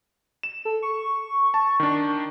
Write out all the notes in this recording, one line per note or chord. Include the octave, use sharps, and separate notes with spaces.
E7
A4
C#6
A5
D#3 D4